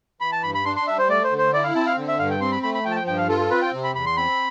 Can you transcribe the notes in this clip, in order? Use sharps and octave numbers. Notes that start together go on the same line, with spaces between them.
E3 B5
A5
G2 B5
B5
D4 C6
C6
G3 E5
C5
A3 D5
C5
D3
C5
E4 D5
F5
C4 A5
F5
D3
E5
G2 F5
G5
C4 C6
B5
A3 B5
B5
F3 G5
A5
G5
G2 G5
F5
F4 A4
A4
C4 B4
G5
C3
B5
E2 B5
C6
C4 B5